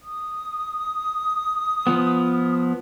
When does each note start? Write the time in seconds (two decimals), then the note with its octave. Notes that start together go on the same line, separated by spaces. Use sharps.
0.02 D#6
1.87 F3 B3